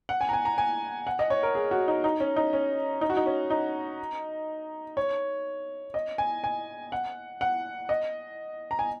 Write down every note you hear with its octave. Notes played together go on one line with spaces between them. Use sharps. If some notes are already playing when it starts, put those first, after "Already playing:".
F#5
G#5
A#5
G#5
A#5
G#5
F#5
D#5
C#5
A#4
G#4
F#4
D#4
D#4
C#4
D#4
C#4
D#4
F#4
D#4
C#4
D#4
C#5
D#5
G#5
G#5
F#5
F#5
D#5
A#5
G#5